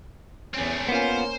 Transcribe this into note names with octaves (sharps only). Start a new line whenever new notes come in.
E2 A3 C4 C#4
A#3 B3 C#4 F4 C5